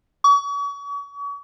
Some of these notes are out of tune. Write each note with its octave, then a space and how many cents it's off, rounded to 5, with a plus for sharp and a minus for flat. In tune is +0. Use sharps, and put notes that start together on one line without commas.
C#6 +40